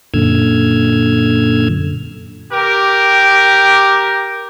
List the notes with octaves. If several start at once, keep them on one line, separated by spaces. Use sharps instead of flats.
F#2 A#2 D3 E6 F6 G#6
G4 A#4